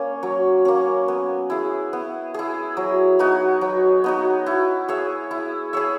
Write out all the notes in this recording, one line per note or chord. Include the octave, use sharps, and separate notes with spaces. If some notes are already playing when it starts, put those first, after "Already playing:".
Already playing: A#3 C#4
F#3
A#3 C#4
B3
E4 G#4
B3
E4 G#4
F#3
B3 D#4 F#4
F#3
B3 D#4 F#4
E4
G#4 C#5 E5
E4
G#4 C#5 E5